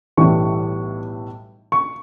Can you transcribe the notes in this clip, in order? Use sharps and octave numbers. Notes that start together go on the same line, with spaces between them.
B1 A2 E3 G3 C#6
C#6